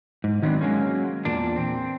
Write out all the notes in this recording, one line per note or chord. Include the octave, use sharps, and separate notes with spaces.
G#2
D#3 F#3 B3 C4 D4
F#3 G#3 A#3 C#4
E2 A#2 D4
C4